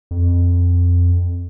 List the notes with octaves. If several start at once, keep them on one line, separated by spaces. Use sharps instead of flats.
F2